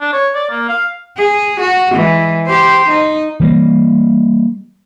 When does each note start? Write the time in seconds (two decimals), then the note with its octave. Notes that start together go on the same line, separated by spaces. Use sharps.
0.01 D4
0.13 C#5
0.35 D5
0.51 A#3
0.69 F5
1.17 G#4
1.60 F#4
1.93 E3 G#3
2.46 G4 C5
2.89 D#4
3.40 E3 G3 A#3